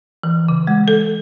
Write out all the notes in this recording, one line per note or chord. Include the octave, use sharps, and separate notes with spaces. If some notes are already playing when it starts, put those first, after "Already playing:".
E3
C#3
G#3
A4